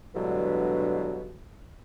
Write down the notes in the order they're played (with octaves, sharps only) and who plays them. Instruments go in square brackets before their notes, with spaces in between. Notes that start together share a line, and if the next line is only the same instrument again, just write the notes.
[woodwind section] G2 B2 D3 E3 F#3 G#3